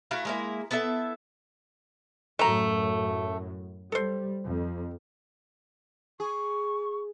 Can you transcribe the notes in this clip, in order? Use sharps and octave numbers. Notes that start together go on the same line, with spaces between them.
A3 E4 F#4 F5
G#3 A#3 E4
B3 E4 A4 E5
F#2 A2 A3 A#5
G3 A4 C5
F2
G#4 C#6